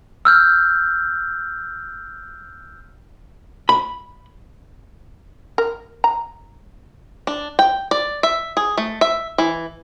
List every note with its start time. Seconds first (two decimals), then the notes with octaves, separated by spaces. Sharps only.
0.25 E6 F6 G6
3.69 B5
5.58 A#4
6.04 A#5
7.27 D4
7.59 G5
7.91 D5
8.23 E5
8.57 G#4
8.78 A3
9.01 E5
9.38 E3